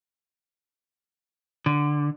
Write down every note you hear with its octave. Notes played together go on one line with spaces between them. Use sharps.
D3